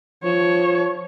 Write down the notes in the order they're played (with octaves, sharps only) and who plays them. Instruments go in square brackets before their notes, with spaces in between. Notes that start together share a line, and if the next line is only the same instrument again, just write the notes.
[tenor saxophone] F3 [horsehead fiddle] C#5